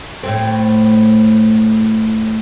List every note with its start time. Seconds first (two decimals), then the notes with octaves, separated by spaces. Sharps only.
0.23 A2 A3 C4